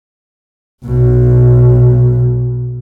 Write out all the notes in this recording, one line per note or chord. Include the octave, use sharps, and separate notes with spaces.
B1 B2